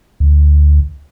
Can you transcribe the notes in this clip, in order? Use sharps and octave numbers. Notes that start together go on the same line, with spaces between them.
D2